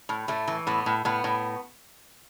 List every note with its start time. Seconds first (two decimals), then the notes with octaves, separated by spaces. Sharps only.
0.09 A2
0.28 A2 A3
0.47 E3
0.67 A2 B3
0.86 A2
1.05 A2 B3
1.24 A2